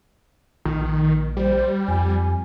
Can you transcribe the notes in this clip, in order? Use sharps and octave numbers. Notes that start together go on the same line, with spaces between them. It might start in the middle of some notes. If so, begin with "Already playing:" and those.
A#1 D#3
G3 C5
F2 G#5